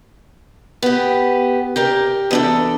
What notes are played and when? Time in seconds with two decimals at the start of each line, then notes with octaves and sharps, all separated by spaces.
0.82 B3 G4
1.76 G4 A#4 D5
2.31 E2 D4 A4